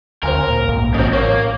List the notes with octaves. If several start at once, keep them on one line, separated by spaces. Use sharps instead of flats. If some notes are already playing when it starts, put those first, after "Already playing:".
D2 C4 F4 A#4 G#5
A#2
B1 G#2 A#3
A1 F#2 F3 C4 D#4
A#3 C#5